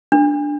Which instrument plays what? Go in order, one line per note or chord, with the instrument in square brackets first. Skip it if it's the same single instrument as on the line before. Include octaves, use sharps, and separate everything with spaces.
[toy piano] D4